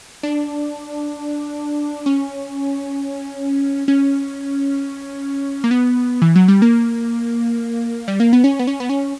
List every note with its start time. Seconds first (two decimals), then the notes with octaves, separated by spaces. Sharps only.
0.23 D4
2.06 C#4
3.88 C#4
5.64 A#3
5.71 B3
6.22 E3
6.36 F#3
6.48 G3
6.62 A#3
8.08 G3
8.20 A#3
8.33 B3
8.44 C#4
8.59 B3
8.67 C#4
8.80 B3
8.89 C#4